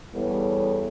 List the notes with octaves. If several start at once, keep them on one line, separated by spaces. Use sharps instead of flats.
E2 G3 B3 E4 A4 C#5